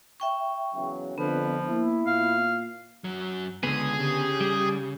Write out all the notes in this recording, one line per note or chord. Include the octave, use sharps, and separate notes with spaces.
E5 G5 C#6
E2 C#3 F#3
F2 D3 F3 B3 B4
A#3 E4
A#2 F5
F#2 F#3
C#2 D3 B3 G#4
C#3 G4
G3